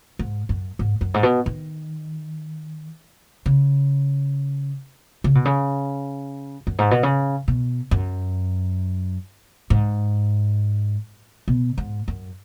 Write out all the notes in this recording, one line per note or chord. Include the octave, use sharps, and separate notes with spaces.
G#2
F#2
G#2
F#2
G#2
B2
D#3
C#3
C#3
B2
C#3
F#2
G#2
B2
C#3
B2
F#2
G#2
B2
G#2
F#2